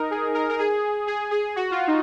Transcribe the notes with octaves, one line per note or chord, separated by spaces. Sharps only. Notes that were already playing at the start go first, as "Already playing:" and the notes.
Already playing: D#4 A#4
G#4
A#4
A#4
G#4
G#4
G#4
F#4
F4
D#4